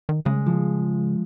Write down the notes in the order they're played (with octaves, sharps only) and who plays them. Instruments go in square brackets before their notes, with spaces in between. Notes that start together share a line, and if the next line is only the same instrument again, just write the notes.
[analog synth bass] D#3
[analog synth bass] C#3 [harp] G#3
[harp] F3